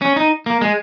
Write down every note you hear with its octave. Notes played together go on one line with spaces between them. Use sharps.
C#4
D#4
A#3
G#3